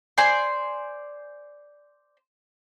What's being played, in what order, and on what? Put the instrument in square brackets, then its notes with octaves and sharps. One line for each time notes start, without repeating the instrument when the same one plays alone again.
[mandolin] C5 D5 G#5 C6